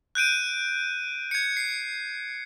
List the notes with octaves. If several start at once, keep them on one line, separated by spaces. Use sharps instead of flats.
F#6 G6 D7 D#7
G#6 C#7
C7